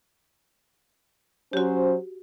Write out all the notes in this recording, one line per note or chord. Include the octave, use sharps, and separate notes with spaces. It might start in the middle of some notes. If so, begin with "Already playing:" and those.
F#3 C#4 F#4 G4 C5